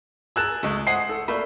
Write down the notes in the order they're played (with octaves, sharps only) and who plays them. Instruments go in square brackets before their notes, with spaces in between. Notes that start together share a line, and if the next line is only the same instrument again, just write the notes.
[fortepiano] G#4 A#4 A5 [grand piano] E6 F#6 E7
[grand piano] C#2 [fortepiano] G#3 A3
[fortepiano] C5 D#5 G#5 [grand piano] F#5 C7 C#7
[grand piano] A4
[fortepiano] A3 A#3 E5 [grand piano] D5 B5